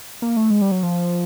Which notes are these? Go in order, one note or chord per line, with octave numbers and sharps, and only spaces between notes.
A#3
A3
G#3
G3
F#3
F3